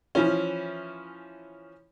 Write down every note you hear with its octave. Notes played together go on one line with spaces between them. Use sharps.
E3 F3 C#4